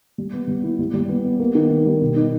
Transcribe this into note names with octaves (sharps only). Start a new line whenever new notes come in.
G3
B3
G3
E4
G3
G3
B3
B3
A#3
D#3
D#3
G3
B2
D#4